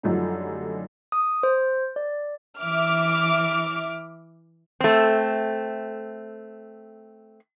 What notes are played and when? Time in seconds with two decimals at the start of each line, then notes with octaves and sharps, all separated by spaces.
0.03 F#2 D3 F3 G3 A3 D#4
1.12 D#6
1.43 C5
1.96 D5
2.61 E3 E5 D6 F6
4.80 A3 C4